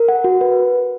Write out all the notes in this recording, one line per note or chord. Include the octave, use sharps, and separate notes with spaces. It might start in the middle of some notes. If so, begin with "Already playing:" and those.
Already playing: A#4
F#5
F#4
B4